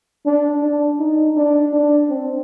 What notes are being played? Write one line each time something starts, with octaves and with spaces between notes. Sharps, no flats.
D4
D4
D#4
D4
D4
C4